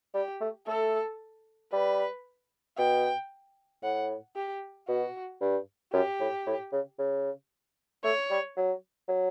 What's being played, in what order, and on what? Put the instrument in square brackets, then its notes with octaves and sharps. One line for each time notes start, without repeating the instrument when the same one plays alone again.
[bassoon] G3 [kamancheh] G4
[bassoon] A3
[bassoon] A3 [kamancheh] A4
[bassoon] G3 [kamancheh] B4
[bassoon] B2 [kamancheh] G5
[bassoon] A2 [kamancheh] F#5
[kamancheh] G4
[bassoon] B2 [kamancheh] F#4
[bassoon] G2
[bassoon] F#2 [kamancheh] G4
[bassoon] A2
A2
C#3
C#3
[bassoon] A3 [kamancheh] C#5
[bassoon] G3
F#3
F#3